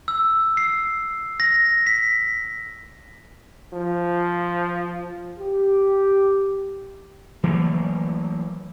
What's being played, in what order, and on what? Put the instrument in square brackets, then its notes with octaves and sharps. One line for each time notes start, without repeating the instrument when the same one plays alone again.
[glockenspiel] E6
C7
A#6
B6
[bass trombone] F3
[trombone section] G4
[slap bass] E3 F#3 A3 A#3